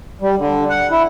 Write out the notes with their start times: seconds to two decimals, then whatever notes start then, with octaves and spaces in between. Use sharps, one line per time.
0.22 G3
0.38 D3
0.69 F#5
0.91 E4